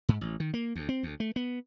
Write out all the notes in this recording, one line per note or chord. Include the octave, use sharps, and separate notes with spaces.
G#2
A1
D#3
A#3
D2
C4
D2
A3
B3